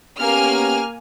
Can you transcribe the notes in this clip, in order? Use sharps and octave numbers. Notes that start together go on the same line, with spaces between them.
A#3 B3 C#4 G4 G#5 F6